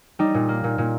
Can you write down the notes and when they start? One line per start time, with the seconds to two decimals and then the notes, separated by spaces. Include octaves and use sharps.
0.19 G3 D#4
0.34 A#2
0.49 A#3
0.64 A#2
0.78 A#2